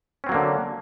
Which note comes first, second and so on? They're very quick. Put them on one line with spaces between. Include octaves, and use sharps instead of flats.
C#4 C4 F#3 A#3 D3